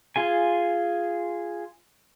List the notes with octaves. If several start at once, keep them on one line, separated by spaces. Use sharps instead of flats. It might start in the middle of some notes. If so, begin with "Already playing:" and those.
F4 G#4 G#5